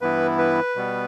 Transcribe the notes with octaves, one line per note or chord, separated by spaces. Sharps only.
G2 E3 B3 E4 B4
B4
B2 G3 B3